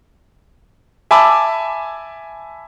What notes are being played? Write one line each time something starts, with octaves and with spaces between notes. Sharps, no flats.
E5 G#5 A5 B5 D6 E6